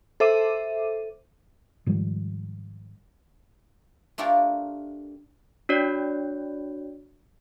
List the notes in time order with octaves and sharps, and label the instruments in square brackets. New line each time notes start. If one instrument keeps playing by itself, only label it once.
[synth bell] A4 C5 E5 D6 D#7
[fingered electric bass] G#2 D#3 F3 G3
[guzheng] A3 D4 F4 G4 A4 A#4
[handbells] D4 F#4 C#5 D5